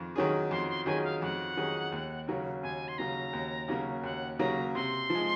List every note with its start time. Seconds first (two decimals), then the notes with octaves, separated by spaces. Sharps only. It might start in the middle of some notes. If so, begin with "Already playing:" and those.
Already playing: F2 D#3
0.16 D#3 F#3 C#4 G#4
0.51 F2 C6
0.69 C6
0.86 D#3 F#3 C#4 G#4 G#5
1.04 F5
1.22 F2 F#5
1.57 D#3 F#3 C#4 G#4
1.92 D#2
2.28 C#3 F#3 A#3
2.63 D#2 G#5
2.88 C6
2.98 C#3 F#3 A#3 A#5
3.33 D#2
3.68 C#3 F#3 A#3
4.04 D#2 F#5
4.39 C#3 F#3 A#3 A#5
4.75 C3 C6
5.10 F3 G#3